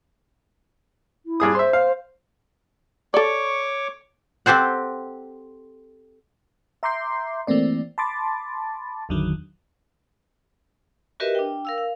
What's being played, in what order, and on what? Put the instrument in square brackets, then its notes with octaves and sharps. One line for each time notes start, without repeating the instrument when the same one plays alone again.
[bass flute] E4
[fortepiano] G2 G#4 D#6
[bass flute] C5 [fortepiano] E5 C6
[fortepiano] F5
[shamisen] A4 D5 [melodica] C#5 C#6 D6
[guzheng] C4 G4 A4 C5 F#5
[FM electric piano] E5 A#5 C6 D6 G6 C7
E3 A3 A#3 C4 D5
A5 B5 C6 D6 A6
G#1 E2 D3 D#3 F#3
[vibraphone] F#4 G4 A#4 B4 D#5 E5
D4 G5
A#4 F5 E6
F5